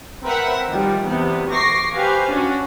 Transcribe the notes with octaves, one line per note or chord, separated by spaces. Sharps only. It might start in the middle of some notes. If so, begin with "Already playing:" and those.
C4 A#4 B4 E5 F#5
D#3 F3 G3
E2 C3 B3
C#6 D6 A#6 C7
G4 B4 C5 F5 G#5
C#4 D4 F#4